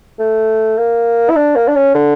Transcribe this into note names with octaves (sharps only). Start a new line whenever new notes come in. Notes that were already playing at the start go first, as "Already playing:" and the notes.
A3
A#3
E4
D4
A#3
D4
C#4
D3